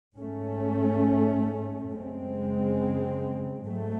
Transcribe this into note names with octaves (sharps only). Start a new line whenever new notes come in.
G#2 A3 C#4
F#2 C#3 G#3 C4
G#2 F#3 A3